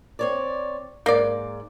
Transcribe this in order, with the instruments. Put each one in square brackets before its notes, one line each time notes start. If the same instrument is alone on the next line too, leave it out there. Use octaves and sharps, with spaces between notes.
[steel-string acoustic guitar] C4 C#5 D5
[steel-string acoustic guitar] G#2 [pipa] A#3 D5